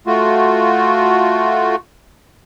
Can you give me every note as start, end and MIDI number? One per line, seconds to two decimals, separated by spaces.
0.07 1.76 57
0.07 1.76 65
0.07 1.76 66